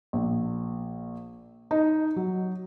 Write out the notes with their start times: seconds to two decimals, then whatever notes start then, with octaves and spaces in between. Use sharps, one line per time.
0.13 A#1
1.71 D#4
2.16 F#3